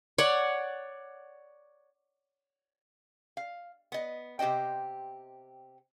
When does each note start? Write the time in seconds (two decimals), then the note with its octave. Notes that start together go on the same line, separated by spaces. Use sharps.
0.18 C#5 D5 F#5
3.37 F5
3.92 B3 D#5
4.39 C3 G4 C5 D#5 G5